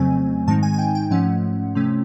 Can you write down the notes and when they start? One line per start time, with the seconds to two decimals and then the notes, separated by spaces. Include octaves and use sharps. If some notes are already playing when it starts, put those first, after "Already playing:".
Already playing: F2 C#3 F#3 A3 C4 G#5
0.47 G#2 D#3 G#3 C4 D#4 A5
0.63 G#5
0.73 G#5
0.79 G5
0.95 G5
1.11 G#2 F3 A3 C#4 F#5
1.75 C3 F3 A3 C#4